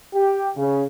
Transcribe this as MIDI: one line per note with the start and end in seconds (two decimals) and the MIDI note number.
0.14 0.49 67
0.55 0.83 49